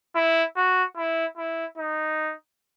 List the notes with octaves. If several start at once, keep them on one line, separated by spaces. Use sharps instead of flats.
E4
F#4
E4
E4
D#4